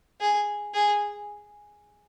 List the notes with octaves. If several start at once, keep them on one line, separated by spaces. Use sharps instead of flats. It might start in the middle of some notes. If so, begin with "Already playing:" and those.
G#4
G#4